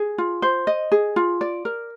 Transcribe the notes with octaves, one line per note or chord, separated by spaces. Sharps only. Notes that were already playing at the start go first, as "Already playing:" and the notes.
Already playing: G#4
F4
C5
D#5
G#4
F4
D5
A#4